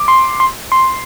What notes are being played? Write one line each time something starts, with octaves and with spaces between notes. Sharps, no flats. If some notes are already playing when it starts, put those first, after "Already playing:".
Already playing: D6
C6
C6
C6